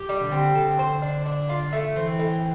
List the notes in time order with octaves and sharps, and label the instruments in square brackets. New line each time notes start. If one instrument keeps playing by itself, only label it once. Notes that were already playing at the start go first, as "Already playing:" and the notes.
Already playing: [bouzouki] G4
G3
[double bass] D3
[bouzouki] C4
[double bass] D3 [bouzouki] A4
[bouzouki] C5
D4
D4
F4
A3
[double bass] E3 [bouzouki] C4
[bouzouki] A2